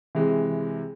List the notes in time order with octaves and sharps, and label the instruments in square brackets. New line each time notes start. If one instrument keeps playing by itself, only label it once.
[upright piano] C3 E3 G#3